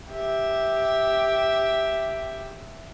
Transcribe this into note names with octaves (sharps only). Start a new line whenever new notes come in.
G4 E5